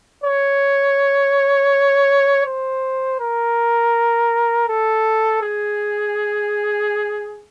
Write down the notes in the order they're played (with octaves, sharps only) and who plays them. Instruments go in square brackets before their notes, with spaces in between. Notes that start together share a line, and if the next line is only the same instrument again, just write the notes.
[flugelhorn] C#5
C5
A#4
A4
G#4